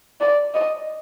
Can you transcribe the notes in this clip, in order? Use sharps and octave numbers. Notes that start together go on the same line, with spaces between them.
D5
D#5